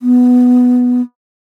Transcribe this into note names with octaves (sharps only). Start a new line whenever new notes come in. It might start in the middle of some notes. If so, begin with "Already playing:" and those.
B3